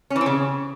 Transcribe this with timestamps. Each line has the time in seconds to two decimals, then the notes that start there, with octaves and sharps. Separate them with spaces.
0.10 C#4
0.16 E3
0.21 C4
0.26 C#3